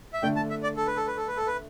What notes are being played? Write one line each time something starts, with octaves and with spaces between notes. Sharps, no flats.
E5
D3 A3 D4 G5
A5
E5
D5
A4
B4
A4
B4
A4
B4
A4
B4